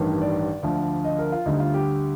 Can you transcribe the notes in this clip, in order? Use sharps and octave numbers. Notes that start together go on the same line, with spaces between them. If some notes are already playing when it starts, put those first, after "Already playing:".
Already playing: A1 G2 D#3 G3
D5
D2 D3 F3
D#5
A#4
F4
D2 D3 G3 D#4
F4
G4